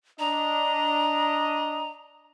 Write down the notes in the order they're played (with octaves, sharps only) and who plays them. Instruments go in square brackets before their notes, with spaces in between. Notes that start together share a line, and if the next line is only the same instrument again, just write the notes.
[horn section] D4 D#5 [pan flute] A#5